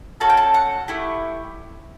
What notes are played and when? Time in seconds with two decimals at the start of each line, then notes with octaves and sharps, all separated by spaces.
0.20 C#4 F#4 A4 A5
0.29 G5
0.37 A5
0.54 F#5
0.88 A3 E4 G4